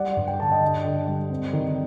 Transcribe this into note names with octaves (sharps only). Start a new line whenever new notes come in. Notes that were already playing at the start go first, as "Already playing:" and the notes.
Already playing: G3 D5 F#5
G2
G5
D3 A5
D#5 G5
D4
D3
G3
C4
D#3